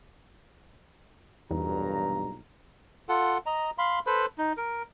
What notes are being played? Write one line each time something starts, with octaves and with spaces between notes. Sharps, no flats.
B1 E2 G2 A#2 A#5
F4 A4 F#5
D#5 A#5
F5 B5 C6
A4 B4 C5 B5
D#4
A#4